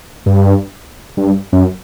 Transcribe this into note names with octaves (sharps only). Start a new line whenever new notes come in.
G2
G2
F#2